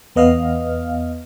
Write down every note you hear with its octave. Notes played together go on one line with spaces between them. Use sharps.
E2 B3 D#5 F5 F6